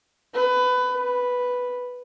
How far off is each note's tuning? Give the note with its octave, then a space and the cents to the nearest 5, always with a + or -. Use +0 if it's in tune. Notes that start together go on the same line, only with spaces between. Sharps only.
B4 +20
B4 +0